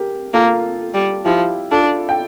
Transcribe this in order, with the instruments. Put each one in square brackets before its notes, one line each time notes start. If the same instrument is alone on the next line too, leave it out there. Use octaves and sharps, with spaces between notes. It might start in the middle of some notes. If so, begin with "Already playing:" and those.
Already playing: [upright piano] G4 A#4
[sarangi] A#3 [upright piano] F4 A4
[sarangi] G3
[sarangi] F3 [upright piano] E4 G4
[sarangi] D4 [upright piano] F4 A4
[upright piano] G5